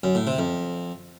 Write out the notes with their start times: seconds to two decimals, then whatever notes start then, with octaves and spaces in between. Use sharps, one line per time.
0.03 F#2
0.15 A2
0.27 C3
0.39 F2